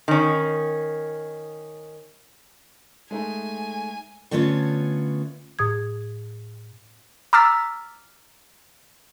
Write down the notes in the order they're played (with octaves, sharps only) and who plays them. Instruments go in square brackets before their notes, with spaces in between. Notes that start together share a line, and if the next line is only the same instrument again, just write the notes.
[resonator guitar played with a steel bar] D#3 C#4
[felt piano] G#3 A3 D#4 [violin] G#5
[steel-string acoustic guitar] D3 A3 B3 C#4 F4 C#5
[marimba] A2 D#6 G#6
[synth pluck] A#5 D6 E6 F6 A6 B6